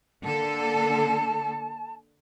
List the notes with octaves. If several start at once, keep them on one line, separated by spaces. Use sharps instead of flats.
D3 A#3 A4 A5